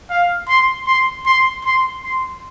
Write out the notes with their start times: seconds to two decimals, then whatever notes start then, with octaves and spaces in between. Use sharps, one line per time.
0.10 F5
0.48 C6
0.87 C6
1.26 C6
1.64 C6
2.03 C6